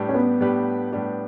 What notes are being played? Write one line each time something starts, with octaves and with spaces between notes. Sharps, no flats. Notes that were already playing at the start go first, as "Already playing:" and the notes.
Already playing: A2 G3 D4 G4 B4
C#4
B3
A2 G3 D4 G4 B4
A2 G3 D4 G4 B4